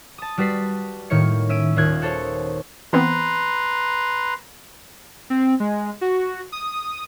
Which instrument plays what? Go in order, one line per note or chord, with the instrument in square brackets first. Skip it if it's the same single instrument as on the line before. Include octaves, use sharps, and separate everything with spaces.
[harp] A5 D#6
G3 F#4 B4 B6 C7
A2 D#3 A#3 C#5 C#7
C#4 E5 E6 D7 D#7
D#1 D#2 F4 F#6 G#6
F#4 A4 C5 C#5
[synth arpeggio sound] E3 B3 C4 [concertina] B4 A#5 C6
[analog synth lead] C4
G#3
F#4
D#6